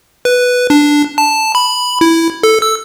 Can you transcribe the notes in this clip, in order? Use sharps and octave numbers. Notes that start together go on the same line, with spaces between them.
B4
D4
A5
B5
E4
A4
E6